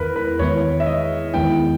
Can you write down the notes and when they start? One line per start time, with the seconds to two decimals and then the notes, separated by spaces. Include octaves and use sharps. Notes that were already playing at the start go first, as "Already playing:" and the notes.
Already playing: E2 D#3 G#3 B3 E4 A#4 B4
0.16 B4
0.39 E2 D#3 G#3 B3 E4 C#5
0.80 E5
0.86 D#5
1.33 E2 D#3 G#3 B3 E4 G5